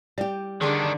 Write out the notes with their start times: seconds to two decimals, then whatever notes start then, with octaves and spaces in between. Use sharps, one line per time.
0.18 G3 G4 D5
0.61 D3 D#3 D4 G#4 A5 C6